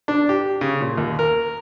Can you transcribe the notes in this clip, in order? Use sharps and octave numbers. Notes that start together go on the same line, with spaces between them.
D4
G4
C#3
A#2
D#2
A#4